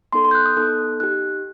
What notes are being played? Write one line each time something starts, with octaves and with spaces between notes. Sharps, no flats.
B3 D#4 A4 C6
C6
G6
F#6
D#6
B3 D#4 A4 F#6
D#4 G4 F#6